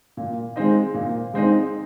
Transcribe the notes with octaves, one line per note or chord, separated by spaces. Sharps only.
A#2
G#3 C4 D#4
A#2
G#3 C4 D#4